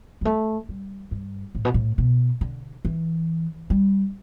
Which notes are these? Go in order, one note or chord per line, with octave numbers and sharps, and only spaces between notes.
G3
A3
G3
G2
A2
B2
A2
B2
D3
E3
G3